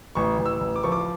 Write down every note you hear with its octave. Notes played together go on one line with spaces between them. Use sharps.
A1 C#6
A1
E6
A1
D6
F3 C#6
D6